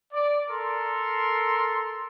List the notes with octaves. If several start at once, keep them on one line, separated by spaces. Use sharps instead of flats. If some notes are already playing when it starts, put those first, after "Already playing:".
D5
A4 A#4 C6